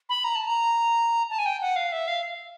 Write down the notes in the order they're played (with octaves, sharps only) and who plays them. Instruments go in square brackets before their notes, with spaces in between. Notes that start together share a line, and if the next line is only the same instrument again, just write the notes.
[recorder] B5
A#5
A5
A#5
A5
G#5
G5
F#5
F5
E5
F5